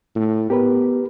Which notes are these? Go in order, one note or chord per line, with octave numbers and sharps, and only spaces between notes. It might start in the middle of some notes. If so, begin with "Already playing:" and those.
A2
B3 G4 A#4 B4